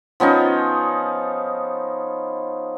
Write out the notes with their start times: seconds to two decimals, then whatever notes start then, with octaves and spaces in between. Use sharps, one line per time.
0.20 F3 B3 C#4 D#4